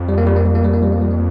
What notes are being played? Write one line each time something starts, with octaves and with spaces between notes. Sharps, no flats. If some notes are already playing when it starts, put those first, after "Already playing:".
Already playing: F2
G3
A#3
G3
A#3
G3
A#3
G3
A#3
G3
A#3
G3
A#3